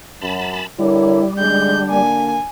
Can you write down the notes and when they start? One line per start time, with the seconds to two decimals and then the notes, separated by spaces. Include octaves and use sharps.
0.21 F#2 A5 B5
0.79 D3 G3 E4 A#4 C#5
1.39 D3 G#3 D4 G6
1.90 A#3 G#5